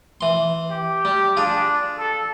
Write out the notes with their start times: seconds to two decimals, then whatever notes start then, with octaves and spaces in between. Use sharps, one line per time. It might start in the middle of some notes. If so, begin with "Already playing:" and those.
0.21 E3 C6
0.70 G4
1.05 G3
1.37 D4 F4 G#4
1.98 A4